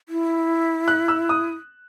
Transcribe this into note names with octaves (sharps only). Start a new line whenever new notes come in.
E4
F#6
E6
D#6